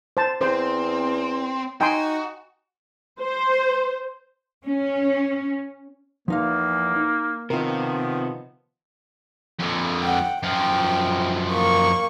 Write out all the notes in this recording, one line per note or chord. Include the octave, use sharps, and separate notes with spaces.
C5 A5
E2 C4 C5
D#4 F#4 G5 G#5 C6
C5
C#4
E2 F3 A#3 D#4 F5
D#4
C3 D#3 F3 B3 F4 A#4
F2 D3
F#5 G5
F#2 F3 G5
A#3 C#6